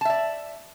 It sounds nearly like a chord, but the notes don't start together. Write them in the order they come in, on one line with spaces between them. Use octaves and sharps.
A5 E5 D5